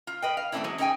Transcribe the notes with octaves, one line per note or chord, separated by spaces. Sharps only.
F4
B4 D#5 G5
F5
E3 A3 A#3 C4 D4 E4
E3 F#3 G#3
C#4 D#4 G#4 D#5 G5 G#5